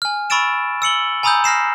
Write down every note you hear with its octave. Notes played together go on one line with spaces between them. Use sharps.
G#5 F6
B5 C#6 E6 A6 D7 E7
E6 C#7 F#7 G7
G#5 A#5 B5 D#6 E6 G6
F6 A#6 C7 E7